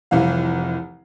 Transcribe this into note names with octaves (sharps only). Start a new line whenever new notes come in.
F1 C2 E3 F5